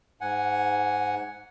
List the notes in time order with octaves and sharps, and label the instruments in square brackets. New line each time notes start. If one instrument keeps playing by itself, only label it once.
[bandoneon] G#2 F#5 G#5